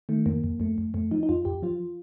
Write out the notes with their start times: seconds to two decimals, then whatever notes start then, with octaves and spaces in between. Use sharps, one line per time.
0.09 D#3 A3
0.26 F2 A#3
0.44 F2
0.60 F2 A3
0.78 F2
0.94 F2 A3
1.11 F3 D#4
1.23 D#4
1.29 F2 F4
1.45 F2 G4
1.62 F3 F4